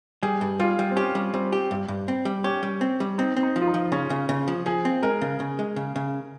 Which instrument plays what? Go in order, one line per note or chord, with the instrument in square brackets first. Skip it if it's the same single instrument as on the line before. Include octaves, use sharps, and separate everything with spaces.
[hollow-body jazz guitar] G3 [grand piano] G#4
[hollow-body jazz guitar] G2
[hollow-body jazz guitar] G3 [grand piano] F4
[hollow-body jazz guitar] G3
[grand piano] C4
[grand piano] C#4 [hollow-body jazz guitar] G4
[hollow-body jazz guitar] G3
[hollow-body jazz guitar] G3 [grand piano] C4
[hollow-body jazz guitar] G4
G2
G2
C4
G3
[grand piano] C#4 [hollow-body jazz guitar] G4
[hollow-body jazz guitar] G3
C4
G3
[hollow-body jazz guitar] C4 [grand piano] D#4
[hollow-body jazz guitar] C4
[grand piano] D#4
[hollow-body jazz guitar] F3
[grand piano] F4
D#4
[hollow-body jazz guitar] F3
[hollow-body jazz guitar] C#3 [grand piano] C#4
[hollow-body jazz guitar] C#3
C#3
F3
[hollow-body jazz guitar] F3 [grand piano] G#4
[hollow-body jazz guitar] C4
[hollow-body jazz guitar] G#3 [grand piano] A#4
[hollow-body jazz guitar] C#3
C#3
G#3
C#3
C#3